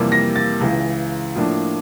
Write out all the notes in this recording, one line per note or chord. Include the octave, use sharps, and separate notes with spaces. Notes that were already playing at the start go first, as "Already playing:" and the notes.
Already playing: F2 C3 E3 G3 A#3
A#6
A6
C#2 C#3 E3
A2 F3 A#3 D4